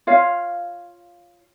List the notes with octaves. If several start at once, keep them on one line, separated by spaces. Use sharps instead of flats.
F4 C#5 F5